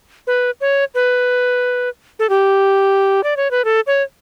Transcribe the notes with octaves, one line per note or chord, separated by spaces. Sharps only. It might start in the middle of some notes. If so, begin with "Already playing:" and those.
B4
C#5
B4
A4
G4
D5
C#5
B4
A4
C#5